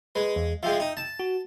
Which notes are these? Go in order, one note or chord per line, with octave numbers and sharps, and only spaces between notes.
G#3 B4
E2
F3 G#3 E5 G5
D#4
A5
F#4